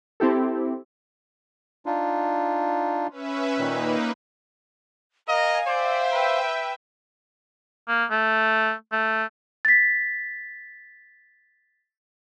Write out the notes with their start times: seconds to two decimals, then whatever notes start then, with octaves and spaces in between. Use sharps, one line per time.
0.20 C4 E4 G4 A4
1.86 D4 D#4 F4
3.10 C#4 B4 E5
3.59 A#2 D#3 A#3 D#4 B4
5.28 A#4 D#5 F5 G#5
5.67 C5 D5 E5 G5
6.12 B4
7.88 A#3
8.11 A3
8.92 A3
9.65 A6 B6